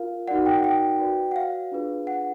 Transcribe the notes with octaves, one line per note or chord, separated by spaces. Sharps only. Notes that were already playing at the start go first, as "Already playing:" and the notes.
Already playing: F4 A#4 F5
D#4 F#4 A#4 D5 F#5
G5
F#5
G5
F#4 B4 D5
F#5
F5
D4 F4 G#4 B4
F#5